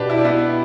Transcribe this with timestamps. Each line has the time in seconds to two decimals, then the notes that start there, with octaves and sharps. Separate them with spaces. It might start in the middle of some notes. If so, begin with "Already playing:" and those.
Already playing: B2 D4 G4 B4
0.09 E4
0.17 D4
0.25 B3 E4